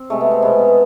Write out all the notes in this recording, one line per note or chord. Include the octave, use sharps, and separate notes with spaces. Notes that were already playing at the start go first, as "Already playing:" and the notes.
Already playing: C4
C3 G#3 A3
B3
C4
B2 G#3 B3
B3